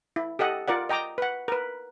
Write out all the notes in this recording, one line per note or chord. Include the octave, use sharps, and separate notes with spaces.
E4
G4 A4 D#5 F#5
F4 A#4 D5 F#5
D#5 G5 A#5 D6
B4 F#5
A#4 B4